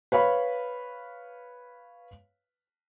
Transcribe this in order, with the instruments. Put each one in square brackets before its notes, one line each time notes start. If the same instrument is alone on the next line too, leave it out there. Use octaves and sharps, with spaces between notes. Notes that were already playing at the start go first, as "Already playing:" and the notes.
[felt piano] B4 C#5 F5 B5